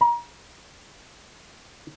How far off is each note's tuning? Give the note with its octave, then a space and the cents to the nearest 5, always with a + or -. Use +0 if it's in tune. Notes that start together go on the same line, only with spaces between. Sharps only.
A#5 +35